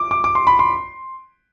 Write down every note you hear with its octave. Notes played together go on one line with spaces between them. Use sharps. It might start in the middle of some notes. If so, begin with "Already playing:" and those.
Already playing: D6
D6
D6
C6
B5
C6